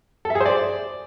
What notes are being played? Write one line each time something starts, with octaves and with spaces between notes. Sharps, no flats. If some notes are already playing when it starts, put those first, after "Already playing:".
A4
E5
G#4
C5
D5